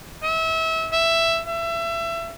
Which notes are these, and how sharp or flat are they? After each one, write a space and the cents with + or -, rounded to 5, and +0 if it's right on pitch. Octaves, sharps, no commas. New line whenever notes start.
E5 -30
E5 +10
E5 +25